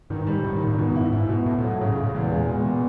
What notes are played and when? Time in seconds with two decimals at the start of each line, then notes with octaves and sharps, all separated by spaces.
0.10 G2 D#3
0.21 G#2
0.27 G3
0.33 G#2
0.44 A2 D#3
0.56 A#2
0.62 D#3
0.67 A2
0.75 G2
0.78 G#2 B2
0.89 G#2
0.96 E4
1.01 G2
1.12 G#2 E4
1.29 B2
1.46 A2 A3
1.58 A#2
1.63 F#3
1.69 A2
1.81 G#2 C#3
1.92 A2
1.97 C#3
2.04 A#2
2.14 E2 A#2
2.32 G#3
2.48 B2
2.65 B2